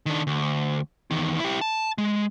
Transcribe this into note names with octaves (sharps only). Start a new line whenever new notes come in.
D#3 D4
D2
E2 D#3
E4 G4
A5
G#3